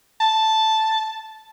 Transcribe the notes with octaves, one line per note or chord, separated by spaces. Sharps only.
A5